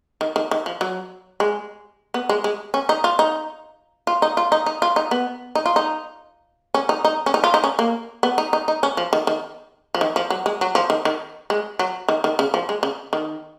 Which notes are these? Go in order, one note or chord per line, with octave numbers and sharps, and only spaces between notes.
D#3
D#3
D#3
F3
F#3
G#3
B3
G#3
G#3
C#4
D#4
F4
D#4
F4
D#4
F4
D#4
D#4
F4
D#4
B3
D#4
F4
D#4
C#4
D#4
D#4
C#4
D#4
F4
D#4
C#4
A#3
B3
D#4
D#4
D#4
C#4
F3
D#3
D#3
F3
D#3
F3
F#3
G#3
F#3
F3
D#3
D#3
G#3
F#3
D#3
D#3
C#3
F3
G#3
C#3
D#3